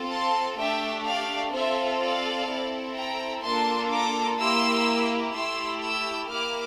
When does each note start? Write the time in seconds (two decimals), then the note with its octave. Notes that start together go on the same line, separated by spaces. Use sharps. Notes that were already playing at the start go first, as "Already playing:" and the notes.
Already playing: C4 F4 A4
0.11 A5 C6
0.59 A3 D4 G4 E5 G5
1.06 D5 F5
1.54 C4 F4 A4 C5 E5
2.01 D5 F5
2.50 C4 E4 A4
2.97 G5 A#5
3.45 A#3 D4 F4 A4 A5 C6
3.92 A#5 D6
4.39 A#3 E4 G4 C6 E6
5.35 A3 E4 G4 C6 E6
5.82 E6 G6
6.30 A#3 E4 G4 D6 F6